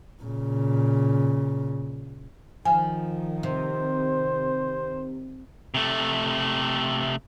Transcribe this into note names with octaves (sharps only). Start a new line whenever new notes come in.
A#2 C#3
D#3 F3 G#5
C3 C5
C3 A3